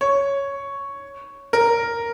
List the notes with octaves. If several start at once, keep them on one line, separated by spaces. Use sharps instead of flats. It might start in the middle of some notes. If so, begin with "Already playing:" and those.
C#5
A#4